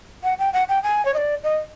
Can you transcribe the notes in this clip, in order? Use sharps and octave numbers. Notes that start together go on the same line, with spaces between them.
F#5
G5
F#5
G5
G#5
C#5
D#5
D5
D#5